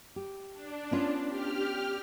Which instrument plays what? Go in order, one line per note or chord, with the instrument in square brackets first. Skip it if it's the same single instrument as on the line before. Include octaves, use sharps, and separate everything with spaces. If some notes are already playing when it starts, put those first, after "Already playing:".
[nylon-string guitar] G4
[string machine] D4
[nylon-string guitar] B3 C#4 F4
[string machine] G4 F6